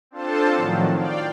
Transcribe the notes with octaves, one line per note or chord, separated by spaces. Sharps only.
C4 D4 F4 A4 C5 A5
A2 D#3 F3 F#3
D5 F5 G5